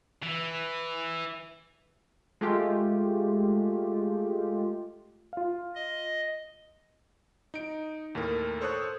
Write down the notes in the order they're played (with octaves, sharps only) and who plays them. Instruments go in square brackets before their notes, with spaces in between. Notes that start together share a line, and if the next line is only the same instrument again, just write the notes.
[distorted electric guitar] E3
[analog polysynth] G#3 A3 F4 G4
[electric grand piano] F4 F5
[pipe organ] D#5
[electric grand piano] D#4 D7
D#2 A2 A4 A#4
A4 C5 C#5 C#6 D#6 F#6